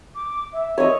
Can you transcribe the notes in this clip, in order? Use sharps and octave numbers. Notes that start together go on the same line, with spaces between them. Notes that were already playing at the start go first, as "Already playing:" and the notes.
D6
E5
C#5 D#5